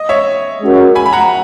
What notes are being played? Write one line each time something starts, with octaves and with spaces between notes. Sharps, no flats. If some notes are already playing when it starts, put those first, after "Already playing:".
Already playing: D#5
C#5 E5
G#3 C#4 F#4 A#4
G#5 B5
B5
F#5 A#5